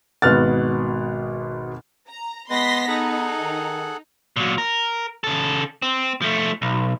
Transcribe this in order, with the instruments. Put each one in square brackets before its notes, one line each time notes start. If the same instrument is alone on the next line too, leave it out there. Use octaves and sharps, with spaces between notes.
[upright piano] G#1 B2 B3 F6 F#6 A6
[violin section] A#5
[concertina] G#3 B4 [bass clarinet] B3 [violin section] C6 A#6 B6
[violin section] D#4 [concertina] G#4 A4 F#5
[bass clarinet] D#3
[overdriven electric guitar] A#2 F#3
A#4
C#3 A4
C4
F3 A3
B1